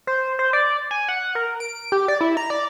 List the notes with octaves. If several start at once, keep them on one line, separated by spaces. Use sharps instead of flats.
C5
C5
D5
G#5
F#5
A#4
D7
G4
D5
E4
A#5
D5